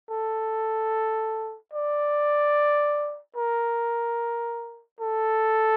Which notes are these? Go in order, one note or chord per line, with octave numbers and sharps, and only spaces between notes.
A4
D5
A#4
A4